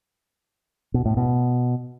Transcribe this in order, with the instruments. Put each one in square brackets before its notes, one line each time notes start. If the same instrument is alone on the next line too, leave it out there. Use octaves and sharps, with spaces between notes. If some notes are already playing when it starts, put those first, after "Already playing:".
[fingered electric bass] B2
A2
B2